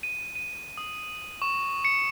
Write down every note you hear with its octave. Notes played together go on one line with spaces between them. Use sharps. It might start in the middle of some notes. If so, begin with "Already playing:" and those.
D#7
D#7
D#6
C#6
C#7